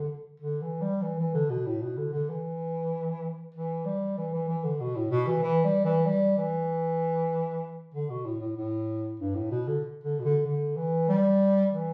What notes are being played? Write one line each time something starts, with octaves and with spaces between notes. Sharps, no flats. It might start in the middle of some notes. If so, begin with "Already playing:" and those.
Already playing: D3
D3
E3
G3
E3
E3
D3
B2
A2
B2
D3
D3
E3
E3
G3
E3
E3
E3
D3
B2
A2
B2
E3
E3
G3
E3
G3
E3
D3
B2
A2
A2
A2
G2
A2
B2
D3
D3
B2
D3
D3
E3
G3
E3